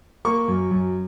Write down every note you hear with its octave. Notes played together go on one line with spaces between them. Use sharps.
A#3 C#6
F#2
F#2